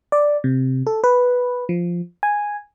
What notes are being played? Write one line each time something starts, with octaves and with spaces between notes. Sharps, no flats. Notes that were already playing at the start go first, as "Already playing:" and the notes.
D5
C3
A4
B4
F3
G#5